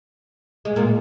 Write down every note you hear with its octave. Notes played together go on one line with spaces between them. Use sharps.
G#3
A#2 A#3